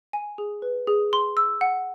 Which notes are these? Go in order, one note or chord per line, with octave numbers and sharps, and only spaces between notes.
G#5
G#4
B4
G#4
C6
E6
F#5